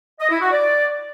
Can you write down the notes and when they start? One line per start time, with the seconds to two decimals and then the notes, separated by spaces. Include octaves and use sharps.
0.20 D#5
0.30 E4
0.41 F#4
0.51 D5